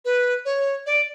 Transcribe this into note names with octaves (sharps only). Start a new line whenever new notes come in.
B4
C#5
D5